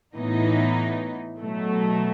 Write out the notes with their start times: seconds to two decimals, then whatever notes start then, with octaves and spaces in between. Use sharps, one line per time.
0.14 A2 E3 B3 D#4
1.40 B2 F#3 A3